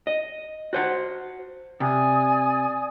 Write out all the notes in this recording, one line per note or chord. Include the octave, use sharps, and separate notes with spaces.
D#5
F#4 C5 F#5
C3 D5 G#5 D#6